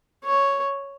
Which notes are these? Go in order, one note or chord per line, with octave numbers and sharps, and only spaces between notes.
C#5